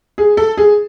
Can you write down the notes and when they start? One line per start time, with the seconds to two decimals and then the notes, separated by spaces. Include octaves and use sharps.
0.18 G#4
0.37 A4
0.57 G#4